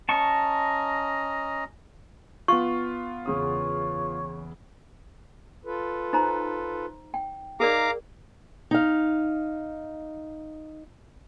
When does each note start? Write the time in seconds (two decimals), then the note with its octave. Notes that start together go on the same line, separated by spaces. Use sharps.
0.09 C#4 D#5 A5 A#5 C#6
2.48 B3 F4 C#6
3.26 E2 C#3 C#5 D#6
5.65 F4 A4 B4
6.13 D#4 C5 A#5
7.14 G5
7.60 D#4 G#4 A#4 D5 F5 A#5 D6
8.71 D#4 F5